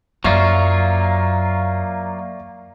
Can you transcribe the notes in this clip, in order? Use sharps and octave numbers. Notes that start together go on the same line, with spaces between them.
F#2 F#3 A#3 F4 D5 E5 C#6